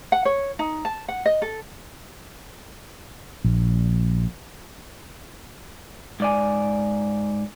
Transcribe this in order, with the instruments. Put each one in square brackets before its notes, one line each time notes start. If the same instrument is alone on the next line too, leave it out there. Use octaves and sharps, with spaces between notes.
[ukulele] F#5
C#5
D#4
A5
F#5
D#5
A4
[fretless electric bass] A#1
[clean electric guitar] G#2 D5 G#5